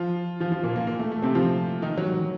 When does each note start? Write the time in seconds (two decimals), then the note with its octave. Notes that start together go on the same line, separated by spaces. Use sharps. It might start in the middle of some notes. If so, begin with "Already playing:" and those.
Already playing: F3 F4
0.40 F3 F4
0.52 F3 F4
0.63 A#2 A#3
0.76 A#2 A#3
0.87 A#2 A#3
0.99 A3
1.12 A3
1.22 C3 C4
1.35 F3 F4
1.82 D#3 D#4
1.98 F#3
2.14 F#3